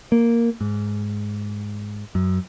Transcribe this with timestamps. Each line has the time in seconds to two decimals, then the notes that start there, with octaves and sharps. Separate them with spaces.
0.12 A#3
0.61 G#2
2.15 F#2